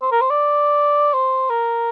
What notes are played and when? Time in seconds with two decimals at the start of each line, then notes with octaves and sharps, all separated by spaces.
0.02 C5
0.11 A#4
0.21 C5
0.30 D5
1.13 C5
1.50 A#4